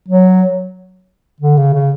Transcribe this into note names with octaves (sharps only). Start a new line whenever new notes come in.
F#3
D3
C#3
C#3